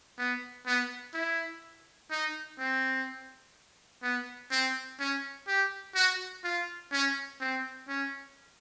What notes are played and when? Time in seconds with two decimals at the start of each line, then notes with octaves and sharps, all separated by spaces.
0.18 B3
0.66 B3
1.14 E4
2.11 D#4
2.59 C4
4.03 B3
4.51 C4
5.00 C#4
5.48 G4
5.95 F#4
6.44 F4
6.92 C#4
7.40 C4
7.88 C#4